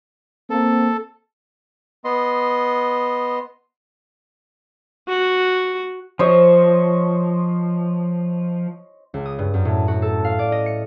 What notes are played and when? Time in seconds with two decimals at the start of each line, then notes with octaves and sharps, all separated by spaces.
0.50 A#3 C4 A4
2.04 B3 D#5 C6
5.09 F#4
6.19 F3 C5 C#5 D#5
9.14 C#2
9.25 D#6
9.38 G2
9.54 F#2
9.65 A2
9.88 F#4
10.02 A4
10.24 F5
10.39 D5
10.52 D#5
10.66 C#7